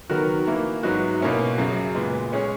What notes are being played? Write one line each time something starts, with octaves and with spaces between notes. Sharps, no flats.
D#3 F#3 B3 F#4 A#4
E3 A#3 E4
G#2 F#3 B3 D#4 F#4
B2 A#3 C#4 E4
F#2 C#3 F#3
A#2 G#3 B3
G#3 C#4 G#4 C#5